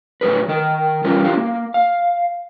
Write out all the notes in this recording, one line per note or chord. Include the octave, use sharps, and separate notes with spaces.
A2 F#3 G#4 B4
D#3 A#4
E3 G3 C#4 F4 A#4
F#3 E4 F4 G4 F5
A#3
F5